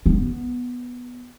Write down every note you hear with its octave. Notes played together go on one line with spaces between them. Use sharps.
B3